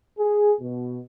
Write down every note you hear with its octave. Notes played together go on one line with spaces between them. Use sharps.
G#4
B2